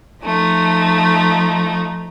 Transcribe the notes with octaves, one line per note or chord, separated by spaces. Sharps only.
F3 A3 D#4